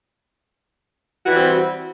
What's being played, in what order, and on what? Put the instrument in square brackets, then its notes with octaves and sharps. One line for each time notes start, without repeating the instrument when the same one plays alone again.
[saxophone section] F#4
E3
G3
G4
C4